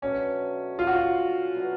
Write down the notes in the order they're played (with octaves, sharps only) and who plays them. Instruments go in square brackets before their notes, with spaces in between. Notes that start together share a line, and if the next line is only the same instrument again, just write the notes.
[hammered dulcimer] B2 F#3 A3 D4 [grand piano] C#4
[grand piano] F4
F#4
F4
[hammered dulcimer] F#3 B3 D4 F#4